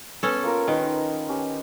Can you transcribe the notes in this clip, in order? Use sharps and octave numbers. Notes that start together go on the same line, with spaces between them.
B3 C#4 A4
A#3 F4 A#4
D#3 D#4 B4
C#4 G4